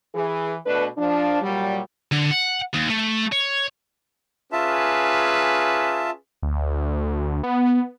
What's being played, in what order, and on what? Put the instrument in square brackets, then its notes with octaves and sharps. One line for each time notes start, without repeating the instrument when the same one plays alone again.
[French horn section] E3 G#4
B2 A3 D4 B4
F3 D4
A#2 F#3 G3
[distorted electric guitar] D3
F#5
D#2
A3
C#5
[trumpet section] C#4 G#4 B4 [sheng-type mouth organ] F4 E5 A5
[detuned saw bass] D2
B3